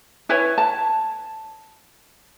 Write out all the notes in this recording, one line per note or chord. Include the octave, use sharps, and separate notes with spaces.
E4 B4 C#5 G#5
A5